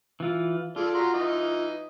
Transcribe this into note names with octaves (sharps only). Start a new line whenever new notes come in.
E3 F4
F4 G#4 A4 D5
F#4 A#5 C6
E3 D#4 D#5